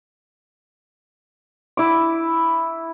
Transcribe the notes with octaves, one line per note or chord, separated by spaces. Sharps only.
E4 D6